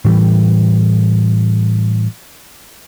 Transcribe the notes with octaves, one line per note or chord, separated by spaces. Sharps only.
A2 E3 G3